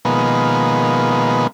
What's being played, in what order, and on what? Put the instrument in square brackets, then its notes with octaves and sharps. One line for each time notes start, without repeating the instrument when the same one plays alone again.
[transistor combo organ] B2 D#3 F3 G#3 A#3 B3